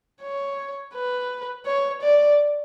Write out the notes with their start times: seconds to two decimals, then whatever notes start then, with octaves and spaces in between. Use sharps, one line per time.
0.22 C#5
0.94 B4
1.66 C#5
2.02 D5